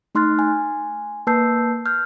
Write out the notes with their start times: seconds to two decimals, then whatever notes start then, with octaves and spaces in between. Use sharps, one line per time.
0.15 A3 D#4 C6 F6 F#6 A6
0.39 G#5
1.27 A#3 B4 A5 E6 G6 C7
1.86 F6 G6